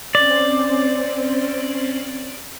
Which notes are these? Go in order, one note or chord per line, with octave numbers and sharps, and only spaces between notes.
C4 C#4 C5 D5